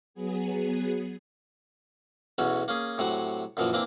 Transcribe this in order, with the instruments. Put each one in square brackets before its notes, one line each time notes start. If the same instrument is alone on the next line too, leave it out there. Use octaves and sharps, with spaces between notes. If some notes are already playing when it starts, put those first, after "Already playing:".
[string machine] F#3 B3 G#4
[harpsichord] B1 E2 E3 C#4 F#4
A#3 C#4 G#4
A2 C3 F#3 F#5
F#2 A#2 E3 F3
E3 A#3 C4 D4